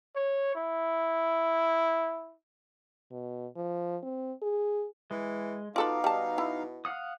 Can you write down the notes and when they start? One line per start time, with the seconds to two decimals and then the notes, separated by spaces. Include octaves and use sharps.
0.15 C#5
0.55 E4
3.11 B2
3.56 F3
4.03 C4
4.42 G#4
5.11 E3 G#3
5.76 B2 D#4 F4 A4 B4 F5 D6
6.04 G3 A5
6.38 E4
6.85 F5 F#5 D#6